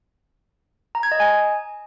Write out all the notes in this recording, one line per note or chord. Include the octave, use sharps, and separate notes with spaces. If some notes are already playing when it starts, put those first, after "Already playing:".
A#5
G#6
D#5
G#5